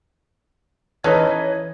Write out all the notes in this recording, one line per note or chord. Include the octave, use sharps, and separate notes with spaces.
E3 C#4 D#4 A4 B4 C#5 D#5